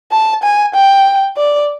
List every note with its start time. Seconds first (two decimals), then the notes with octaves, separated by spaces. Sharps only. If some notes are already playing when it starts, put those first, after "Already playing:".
0.12 A5
0.43 G#5
0.74 G5
1.37 D5